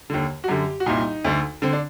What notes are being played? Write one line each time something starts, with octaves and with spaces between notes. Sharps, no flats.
D#2 D3
F#4
F#2 D3 G4
F#4
C2 A#2 D#4
D2 D3
D3 C4
D4